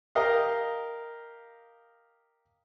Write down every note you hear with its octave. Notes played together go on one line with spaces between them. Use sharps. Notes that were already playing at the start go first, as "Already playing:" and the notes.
G4 A#4 D#5 F5 D#6